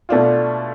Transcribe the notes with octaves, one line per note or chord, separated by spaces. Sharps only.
B2 A3 D4 F4